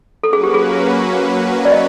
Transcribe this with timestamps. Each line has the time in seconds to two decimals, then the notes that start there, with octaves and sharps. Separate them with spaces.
0.23 F#3 A#3 C#4 F#4 A4 B4
0.33 G#4
0.44 G4
0.54 G#4
1.65 D5
1.72 D#5